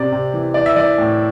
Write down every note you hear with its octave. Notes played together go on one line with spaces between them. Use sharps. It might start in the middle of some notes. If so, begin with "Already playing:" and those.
Already playing: C3 C4 D5
C3
E3
E3 D5
E5
E3 D5
A2